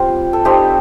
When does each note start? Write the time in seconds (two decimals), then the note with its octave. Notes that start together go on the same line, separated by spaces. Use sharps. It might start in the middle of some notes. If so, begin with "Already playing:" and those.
Already playing: G3 C4 F4 G4
0.33 A4
0.45 G3 C4 D#4 G4